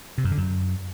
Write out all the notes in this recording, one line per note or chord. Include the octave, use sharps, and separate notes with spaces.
C3
F#2
D3
F#2